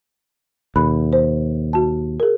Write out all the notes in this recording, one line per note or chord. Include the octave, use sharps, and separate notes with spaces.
D#2 B2 B5 F#6
C5
F#4 A5
G#4 A#4